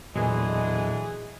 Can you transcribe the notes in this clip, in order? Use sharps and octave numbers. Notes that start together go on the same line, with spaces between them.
E2 A#2 D3 E3 F#3 G#3 G#4 G#5